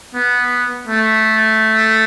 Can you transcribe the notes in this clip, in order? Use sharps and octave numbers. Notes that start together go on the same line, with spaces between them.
B3
A3